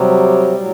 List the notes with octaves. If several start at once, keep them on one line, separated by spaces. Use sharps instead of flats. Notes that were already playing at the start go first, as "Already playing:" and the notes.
Already playing: C3 F#3 G3
A2 F#3